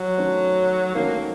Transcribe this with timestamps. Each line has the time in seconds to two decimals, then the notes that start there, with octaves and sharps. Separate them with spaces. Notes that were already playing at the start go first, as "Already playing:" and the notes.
Already playing: F#3
0.18 D#3 A3 C#4 F#4 C5
0.95 D#3 A3 A#3 C#4 F#4 C5